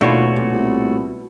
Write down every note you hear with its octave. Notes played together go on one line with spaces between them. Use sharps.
D#2 B2 A3 D4 F4 F#4 C#5
D1 A#2
C2